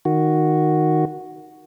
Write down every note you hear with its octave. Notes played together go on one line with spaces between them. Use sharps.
D#3 F#4